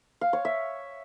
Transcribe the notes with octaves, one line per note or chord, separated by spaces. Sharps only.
F5
C#5
E5